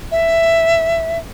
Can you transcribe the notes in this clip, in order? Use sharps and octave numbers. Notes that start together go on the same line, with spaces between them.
E5